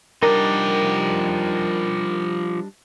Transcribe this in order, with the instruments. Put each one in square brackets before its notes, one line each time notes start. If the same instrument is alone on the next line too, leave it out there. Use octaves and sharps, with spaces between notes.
[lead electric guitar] F3 G4 [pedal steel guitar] G3 D4 D#4 [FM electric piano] A#4